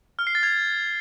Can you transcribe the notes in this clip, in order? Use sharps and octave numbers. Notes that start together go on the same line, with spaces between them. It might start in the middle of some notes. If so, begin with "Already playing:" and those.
F6
C7
A6
G#6